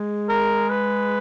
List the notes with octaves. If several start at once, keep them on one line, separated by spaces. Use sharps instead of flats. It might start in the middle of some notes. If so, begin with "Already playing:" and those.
Already playing: G#3
A#4
B4